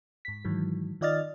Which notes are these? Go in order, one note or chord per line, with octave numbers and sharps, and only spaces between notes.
G#2 B6
G#2 D#3 E3 F#3
D#3 F4 D5 D#5 F6 A6